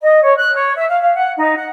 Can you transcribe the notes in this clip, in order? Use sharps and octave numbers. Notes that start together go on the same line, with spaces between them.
D#5
C#5
F#6
C#5
E5
F5
F5
F#5
D#4
F#5